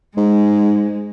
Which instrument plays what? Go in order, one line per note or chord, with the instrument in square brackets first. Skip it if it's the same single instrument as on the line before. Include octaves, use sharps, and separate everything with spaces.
[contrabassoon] G#2 [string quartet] G#3